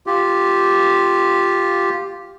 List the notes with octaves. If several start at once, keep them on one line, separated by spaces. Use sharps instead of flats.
F4 G4